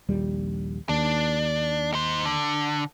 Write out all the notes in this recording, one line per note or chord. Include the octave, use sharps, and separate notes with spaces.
A#1 D#2 G3
D#2 D4
D#4 C5
D3